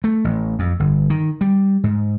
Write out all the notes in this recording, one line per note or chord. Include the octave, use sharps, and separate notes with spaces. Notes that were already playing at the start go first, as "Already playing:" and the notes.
A3
A1
F2
G1
D#3
G3
G#2